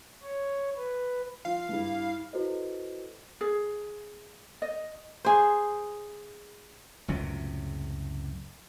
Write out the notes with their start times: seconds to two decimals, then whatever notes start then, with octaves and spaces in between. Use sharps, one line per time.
0.23 C#5
0.77 B4
1.45 F3 F4 F5
1.69 G2 G3 E4
2.33 E4 F#4 A4 B4 C5 D#5
3.41 G#4
4.62 D#5
5.25 G#4 C5
7.08 C#2 F#2 A2 C3